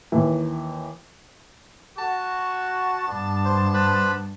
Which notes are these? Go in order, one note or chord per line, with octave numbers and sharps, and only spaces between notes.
D#2 E3
F#4 A5
G2 B3 D4 D6
C5
B4 C5 B5